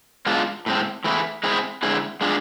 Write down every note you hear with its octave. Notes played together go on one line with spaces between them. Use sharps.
B2 G#3 D4 F4
A2 G#3 C4
E3 A3 E4 G#4
G#3 C4 E4 G#4
D3 G#3 C4 E4 G#4
G#3 D4 F4 G#4